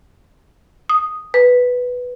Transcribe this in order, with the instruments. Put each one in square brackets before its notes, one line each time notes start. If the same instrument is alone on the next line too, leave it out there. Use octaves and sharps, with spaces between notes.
[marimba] D#6
B4